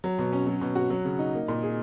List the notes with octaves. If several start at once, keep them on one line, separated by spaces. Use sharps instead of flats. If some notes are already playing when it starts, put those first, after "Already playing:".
F#3
B2
C#4
F#3
B2
F#4
F#3
C#3
D#4
A#3
A#2
G#4